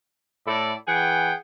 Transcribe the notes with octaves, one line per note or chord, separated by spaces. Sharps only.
A2 E4 A4 D5
E3 G#4 F#5 G5